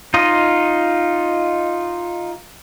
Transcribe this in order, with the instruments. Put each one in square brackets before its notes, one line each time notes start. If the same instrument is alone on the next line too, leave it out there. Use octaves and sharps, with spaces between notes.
[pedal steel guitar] D#4 F4 D#5